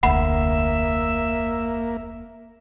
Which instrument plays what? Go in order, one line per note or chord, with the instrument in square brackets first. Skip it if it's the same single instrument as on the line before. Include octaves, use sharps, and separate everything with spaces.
[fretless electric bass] F1 D2 [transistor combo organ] A#3 [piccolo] E5 [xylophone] F#5 B5